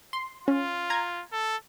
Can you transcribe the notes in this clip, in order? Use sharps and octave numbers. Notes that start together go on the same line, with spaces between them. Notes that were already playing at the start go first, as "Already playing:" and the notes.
C6
C#4 F4
A#5 G#6
A4